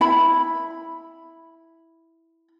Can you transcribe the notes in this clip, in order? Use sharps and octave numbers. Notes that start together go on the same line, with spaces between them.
E4 B5